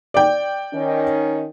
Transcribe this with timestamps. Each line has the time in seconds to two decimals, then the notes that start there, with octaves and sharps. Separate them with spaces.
0.14 D5 G5
0.73 D#3 C#4